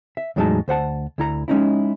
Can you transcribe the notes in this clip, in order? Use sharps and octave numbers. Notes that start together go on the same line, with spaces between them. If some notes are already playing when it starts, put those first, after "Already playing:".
E5
E2 A2 F#3 G#3 D#4 A5
D2 C5 F#5 A5
D2 E4 A#5
G#3 C#4 D#4 E4